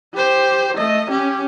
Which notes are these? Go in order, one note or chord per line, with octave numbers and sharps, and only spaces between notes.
G4 C5
A3 D#5
C#4 G4